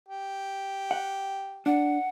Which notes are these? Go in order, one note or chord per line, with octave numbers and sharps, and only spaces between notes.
G4
F#5
D4 F#5